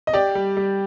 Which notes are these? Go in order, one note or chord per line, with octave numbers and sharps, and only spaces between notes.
D#5
G4 D5
G3
G3